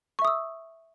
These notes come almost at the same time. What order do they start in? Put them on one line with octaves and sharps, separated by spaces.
C#6 E5 D#6 E6